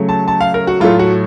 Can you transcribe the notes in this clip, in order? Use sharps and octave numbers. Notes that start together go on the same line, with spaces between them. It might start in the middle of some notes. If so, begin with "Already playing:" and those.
Already playing: C#3 F#3 A3
A5
A5
F5
A#4
F#4
A2 F#3 A3 F4
F#4